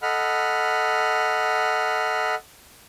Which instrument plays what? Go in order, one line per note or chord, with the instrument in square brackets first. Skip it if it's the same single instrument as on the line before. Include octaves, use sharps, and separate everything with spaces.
[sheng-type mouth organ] A4 D#5 F#5 B5 F6